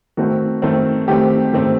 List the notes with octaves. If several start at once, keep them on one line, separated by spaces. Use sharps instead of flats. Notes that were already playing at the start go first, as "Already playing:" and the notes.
D#3 A3 C4 F#4
D#3 A3 C4
D#3 A3 C4 G4
D#3 A3 C4